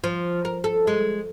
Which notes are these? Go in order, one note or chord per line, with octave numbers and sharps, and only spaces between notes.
F3
A#4
A4
G#3